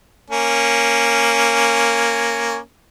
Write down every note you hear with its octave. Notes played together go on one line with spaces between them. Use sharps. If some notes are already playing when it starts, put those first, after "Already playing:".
A#3 C#4